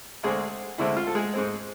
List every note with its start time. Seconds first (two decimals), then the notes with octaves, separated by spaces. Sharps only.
0.23 D2 D3 G#3 C4 G#4
0.78 D2 D3 G#3 C4 E4
0.97 F4
1.07 A4
1.15 G#3 G#4
1.34 G#2 G#3 C4